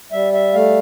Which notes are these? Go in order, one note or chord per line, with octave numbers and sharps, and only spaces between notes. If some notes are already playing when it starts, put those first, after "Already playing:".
G3 E5
E5
A3 F5